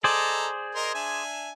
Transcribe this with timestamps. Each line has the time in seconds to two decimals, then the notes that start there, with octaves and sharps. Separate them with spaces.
0.04 G#4 A4 C5 D5 D#5 A#5
0.75 A#4 D#5 C6
0.95 D4 E5 G#5